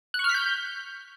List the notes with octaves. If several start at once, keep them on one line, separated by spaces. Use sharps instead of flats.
F#6
C#6
F6
B6
G6